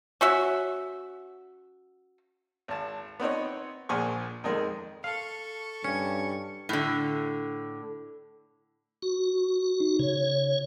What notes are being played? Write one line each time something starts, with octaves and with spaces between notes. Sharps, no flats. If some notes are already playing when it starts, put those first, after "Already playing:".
C#4 F#4 E5
G#1 A5
B3 C4 D#4 C#5
A#1 A#2 F3 G#4 C#6
F2 D#3 G#3
A4 F5 C#6
G2 C#4 C#7
A2 D3
F#4
D#4
C#3 C#5